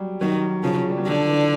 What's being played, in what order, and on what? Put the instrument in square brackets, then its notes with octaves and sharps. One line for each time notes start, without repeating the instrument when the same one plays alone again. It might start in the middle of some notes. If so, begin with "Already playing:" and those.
Already playing: [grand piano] F#3 G3
[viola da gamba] D#3 [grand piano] F#3
[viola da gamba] C#3 [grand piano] F3
[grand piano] G3
F#3
[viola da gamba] D3 [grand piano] F3
[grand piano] E3